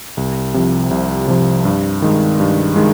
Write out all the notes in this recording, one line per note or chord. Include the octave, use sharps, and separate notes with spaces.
C2
C3 F3
C2
C3 F3
G2
D#3 G#3
G2
D#3 G#3